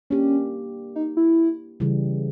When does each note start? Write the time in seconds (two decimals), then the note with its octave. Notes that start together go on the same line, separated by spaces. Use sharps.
0.10 A#3 C#4 D4 G4
0.96 D#4
1.17 E4
1.80 C#3 E3 G3